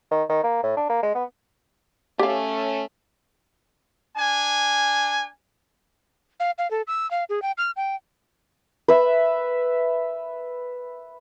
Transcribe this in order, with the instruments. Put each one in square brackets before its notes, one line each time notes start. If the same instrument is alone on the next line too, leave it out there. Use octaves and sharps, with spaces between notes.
[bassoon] D#3
D#3
A#3
A2
D4
A#3
G#3
B3
[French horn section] A3 C#4 [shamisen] G4 F5
[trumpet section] D4 G#5
[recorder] F5
F5
A4
E6
F5
G#4
G5
F6
G5
[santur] B4 E5